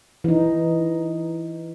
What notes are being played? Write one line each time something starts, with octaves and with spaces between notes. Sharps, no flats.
E3 D#4